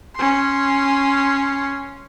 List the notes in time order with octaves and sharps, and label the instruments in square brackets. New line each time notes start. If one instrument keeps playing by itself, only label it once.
[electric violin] C#4 C6